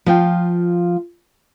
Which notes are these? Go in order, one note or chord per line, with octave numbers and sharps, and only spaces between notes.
F3 F4 G5